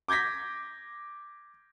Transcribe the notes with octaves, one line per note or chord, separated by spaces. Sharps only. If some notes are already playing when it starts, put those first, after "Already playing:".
D6 G6 G#6 A#6 B6